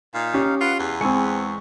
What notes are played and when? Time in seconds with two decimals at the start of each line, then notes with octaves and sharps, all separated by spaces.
0.14 A#2 D#4 F5
0.34 C#4 G4
0.61 F4 B4 F#5
0.80 E2 B4
1.01 G#3 C4 G#5 C#6 C#7